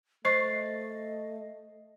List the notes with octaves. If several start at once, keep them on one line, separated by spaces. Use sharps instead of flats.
A3 C5 D#5 C#6 A6 C7